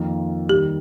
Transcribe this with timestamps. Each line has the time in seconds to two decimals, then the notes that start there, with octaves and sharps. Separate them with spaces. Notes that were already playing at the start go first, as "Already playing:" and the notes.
Already playing: F2 D#3 A#3 F4
0.49 D#2 D#3 G3 G4